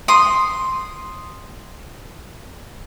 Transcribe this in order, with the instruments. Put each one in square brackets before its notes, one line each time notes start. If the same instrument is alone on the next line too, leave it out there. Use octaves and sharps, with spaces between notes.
[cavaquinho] C6 D#6